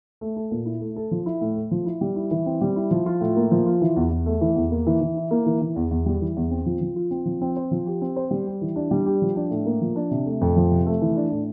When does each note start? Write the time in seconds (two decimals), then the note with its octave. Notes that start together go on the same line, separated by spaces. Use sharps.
0.21 A3
0.36 A4
0.51 A#2
0.66 E4
0.81 A3
0.96 A4
1.11 F3
1.26 E4
1.41 A2
1.56 A3
1.71 F3
1.86 E4
2.01 G3
2.16 E4
2.31 E3
2.46 C4
2.61 G3
2.76 E4
2.91 F3
3.06 F4
3.21 A2
3.36 A#3
3.51 F3
3.66 F4
3.81 E3
3.96 E2
4.11 E2
4.26 A3
4.41 E3
4.56 E2
4.71 A#3
4.86 E3
5.01 E3
5.16 E4
5.31 A#3
5.46 E3
5.61 E3
5.76 E2
5.91 E2
6.06 G3
6.21 E3
6.37 E2
6.51 C4
6.66 F3
6.81 F3
6.96 F4
7.11 C4
7.26 F3
7.41 C4
7.56 C5
7.71 F3
7.86 G4
8.01 C4
8.16 C5
8.31 G3
8.47 G4
8.61 E3
8.76 D4
8.91 G3
9.06 G4
9.22 F3
9.36 D4
9.51 A2
9.66 A#3
9.81 F3
9.96 D4
10.11 C3
10.26 A3
10.41 F2
10.56 F3
10.71 C3
10.86 A3
11.02 E3
11.16 D4
11.31 A2